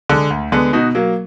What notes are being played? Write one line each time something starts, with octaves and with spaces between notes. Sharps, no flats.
D3 G#3
D2
D3 G#3 B3
B2 D#4 F#4
F#3 A#3